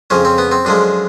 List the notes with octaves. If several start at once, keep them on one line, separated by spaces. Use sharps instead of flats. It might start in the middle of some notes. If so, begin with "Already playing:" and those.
F2 C#3 F3 C#4
C4
B3
C4
F#2 D3 F3 G#3 D4